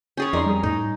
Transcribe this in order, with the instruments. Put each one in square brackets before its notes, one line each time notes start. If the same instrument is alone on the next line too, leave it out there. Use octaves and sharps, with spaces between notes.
[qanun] C#4 G#4 C#5 [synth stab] G6 A6
[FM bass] F2 [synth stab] D#4 D5 C6 [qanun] A#4
[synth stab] G3 G#4
[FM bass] A2 [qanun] D#4